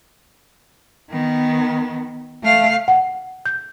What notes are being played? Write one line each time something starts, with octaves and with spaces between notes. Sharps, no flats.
D#3 B3
A3 F5
F#5
G6